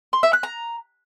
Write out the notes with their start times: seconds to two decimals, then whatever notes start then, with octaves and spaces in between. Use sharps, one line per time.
0.13 C6
0.23 E5
0.33 F#6
0.43 A#5